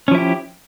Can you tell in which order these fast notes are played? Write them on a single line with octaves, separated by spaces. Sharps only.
C#4 F3 E4 G4